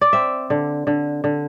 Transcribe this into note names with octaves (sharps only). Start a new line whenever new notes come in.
D5
C4 E5
D3
D3
D3